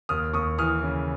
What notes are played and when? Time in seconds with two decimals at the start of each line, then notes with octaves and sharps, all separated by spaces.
0.09 D#2 D#6 F6
0.33 D#2 C#6 D#6
0.58 E3 D#6 F6
0.83 C#3